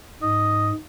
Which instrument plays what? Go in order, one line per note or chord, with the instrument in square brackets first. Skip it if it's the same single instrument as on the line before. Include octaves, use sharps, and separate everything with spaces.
[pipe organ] G#2 [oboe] D#5